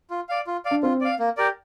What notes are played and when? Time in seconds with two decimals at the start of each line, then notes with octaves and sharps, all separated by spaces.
0.10 F4
0.29 D5 F5
0.47 F4
0.65 D5 F5
0.71 D4
0.83 C4 F4
1.01 D5 F5
1.19 A#3
1.37 G4 A#4 D5